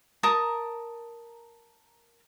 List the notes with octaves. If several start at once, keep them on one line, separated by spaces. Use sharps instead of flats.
A#4 A5 A#5 D#6